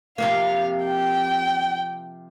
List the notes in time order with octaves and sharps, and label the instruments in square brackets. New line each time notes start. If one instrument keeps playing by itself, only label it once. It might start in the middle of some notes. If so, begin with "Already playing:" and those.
[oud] C3 F3 A#3 [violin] F5
[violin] G5